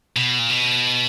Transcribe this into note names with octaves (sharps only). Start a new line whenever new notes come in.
B2
A#2
B2